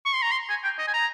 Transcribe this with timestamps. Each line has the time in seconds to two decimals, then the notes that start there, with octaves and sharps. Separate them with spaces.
0.06 C#6
0.14 C6
0.22 A#5
0.31 C6
0.50 G#5
0.64 G5
0.78 D#5
0.87 G#5
0.94 A#5